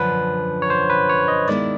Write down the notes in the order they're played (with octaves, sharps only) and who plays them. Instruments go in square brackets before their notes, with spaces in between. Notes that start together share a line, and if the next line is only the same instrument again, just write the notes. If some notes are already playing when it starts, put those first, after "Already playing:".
Already playing: [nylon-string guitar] F#2 D3 F3 [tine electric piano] B4
[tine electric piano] C#5
C5
B4
C#5
D#5
[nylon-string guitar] D#3 G#3 B3 E4 [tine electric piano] D5